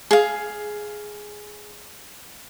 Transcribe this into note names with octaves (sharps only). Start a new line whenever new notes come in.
G#4 F5